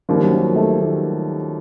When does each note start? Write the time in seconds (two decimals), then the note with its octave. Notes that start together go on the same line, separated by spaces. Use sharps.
0.09 D#2 D#3 F3 G3 A#3
0.23 F#3
0.32 F3
0.56 A3
0.79 D#2 D#3 G3 A#3